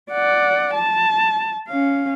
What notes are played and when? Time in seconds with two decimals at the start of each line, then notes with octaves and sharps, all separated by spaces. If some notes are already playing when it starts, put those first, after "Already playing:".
0.12 D5 F#5
0.74 A5
1.68 C#4 F5